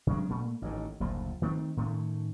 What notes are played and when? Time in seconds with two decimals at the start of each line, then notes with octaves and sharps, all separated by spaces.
0.07 C3 F#3 G#3 D4
0.30 A#2 A3
0.62 A1 A2 D#3
1.00 F#1 D2 A#2 F3
1.42 D#3 A3 C4
1.77 A2 D#3 A3 C#4